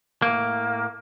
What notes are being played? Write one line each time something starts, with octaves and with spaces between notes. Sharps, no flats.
A2 A#3